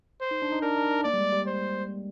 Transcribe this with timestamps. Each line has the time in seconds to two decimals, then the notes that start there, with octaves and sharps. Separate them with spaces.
0.21 C5
0.31 D#4
0.42 D4
0.52 D#4
0.62 D4 A#4
0.77 D4
0.91 D4
1.04 A#3 D5
1.14 G3
1.18 G#3
1.32 G3
1.47 C5